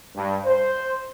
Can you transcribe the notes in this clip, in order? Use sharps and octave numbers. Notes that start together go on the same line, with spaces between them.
G2
C5